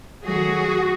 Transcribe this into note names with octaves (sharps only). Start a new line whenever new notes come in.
D#3 F#3 A3 F#4 G#4